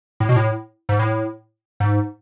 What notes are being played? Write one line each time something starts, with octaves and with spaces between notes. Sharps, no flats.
A2
B2
A2
G#2
A2
G#2